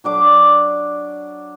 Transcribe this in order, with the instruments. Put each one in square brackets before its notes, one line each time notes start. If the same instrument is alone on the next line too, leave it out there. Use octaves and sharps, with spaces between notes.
[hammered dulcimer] F#3 D4 D6